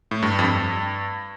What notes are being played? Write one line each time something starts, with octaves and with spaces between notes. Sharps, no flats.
A2
G2
F2
G2